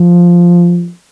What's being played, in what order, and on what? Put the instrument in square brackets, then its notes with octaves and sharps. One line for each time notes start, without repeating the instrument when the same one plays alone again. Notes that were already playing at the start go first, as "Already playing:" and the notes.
Already playing: [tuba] F3